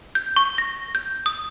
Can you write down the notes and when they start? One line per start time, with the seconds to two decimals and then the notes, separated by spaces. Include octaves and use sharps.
0.15 G6
0.36 C#6
0.58 A#6
0.95 G6
1.26 D#6